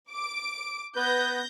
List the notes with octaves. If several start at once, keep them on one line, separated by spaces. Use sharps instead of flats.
D6 D7
B3 B4 G6 A#6